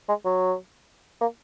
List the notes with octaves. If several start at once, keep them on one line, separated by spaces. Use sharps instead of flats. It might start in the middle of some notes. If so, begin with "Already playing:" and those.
G#3
F#3
A#3